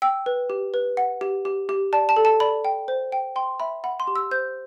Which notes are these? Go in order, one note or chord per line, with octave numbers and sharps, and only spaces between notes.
G5 E6
B4
G4
B4
F#5
G4
G4
G4
D5 A5
A5
A4
A5
D5 B5
G5
C5
G5
G5 C6
E5 B5
F#5 B5
C6
G4
E6
C5 G6